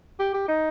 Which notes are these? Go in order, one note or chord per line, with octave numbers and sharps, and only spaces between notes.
G4
G4
D#4